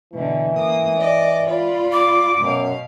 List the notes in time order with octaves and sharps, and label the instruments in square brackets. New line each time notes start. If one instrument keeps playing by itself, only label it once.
[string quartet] B2 D3 [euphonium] E3
[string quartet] A#3 D#6
D5 D#5 D6
F4 D5 B5
[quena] D6
[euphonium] F#2 [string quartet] B2 F5